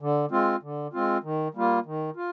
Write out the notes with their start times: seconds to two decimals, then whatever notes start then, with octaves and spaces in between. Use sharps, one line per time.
0.01 D3
0.31 G#3 C4 F4
0.63 D3
0.93 G#3 C4 F4
1.23 D#3
1.54 G3 A#3 F4
1.86 D#3
2.16 F4